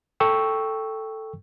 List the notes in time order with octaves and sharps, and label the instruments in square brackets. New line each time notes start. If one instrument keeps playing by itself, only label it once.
[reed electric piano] A4 G5 C#6 E6